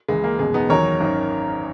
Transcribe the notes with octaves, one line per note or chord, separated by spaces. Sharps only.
C#2 C#3 E3 G#3
A#3
F#1 E2 B2 G#3
B3 D#4
E2 D#3 F#3 A#4 C#5
G#1 F#2 D#3